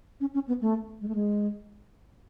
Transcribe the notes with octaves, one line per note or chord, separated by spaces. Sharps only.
C#4
C#4
B3
A3
G#3
A3
G#3